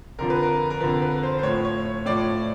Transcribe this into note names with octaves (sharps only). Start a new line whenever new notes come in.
F2 D3 F3 A#4
B4
A#4
A#4
F2 D3 F3 B4
B4
C5
C5
A2 F3 C#5
C#5
C#5
A2 F3 D5